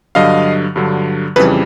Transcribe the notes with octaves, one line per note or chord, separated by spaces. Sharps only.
G2 D3 F#3 D#5 F5
G2 D3 F#3
F2 C#3 E3 G3 B4